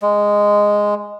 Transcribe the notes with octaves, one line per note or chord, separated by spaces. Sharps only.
G#3